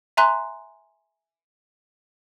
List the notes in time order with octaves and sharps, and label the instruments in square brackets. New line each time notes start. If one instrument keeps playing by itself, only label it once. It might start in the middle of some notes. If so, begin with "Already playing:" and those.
[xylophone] E5 G#5 A#5 C6 F#6